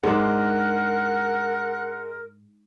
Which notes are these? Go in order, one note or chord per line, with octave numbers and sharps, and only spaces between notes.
G#2 G#3 D4 A#4 F#5